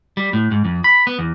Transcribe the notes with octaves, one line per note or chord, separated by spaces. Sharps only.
G3
A2
G#2
F2
B5
B3
E2